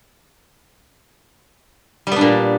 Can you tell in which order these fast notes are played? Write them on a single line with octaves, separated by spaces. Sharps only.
G3 B3 D4 A#2